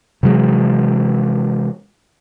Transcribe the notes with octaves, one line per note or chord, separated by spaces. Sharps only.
C3 E3 F#3 G#3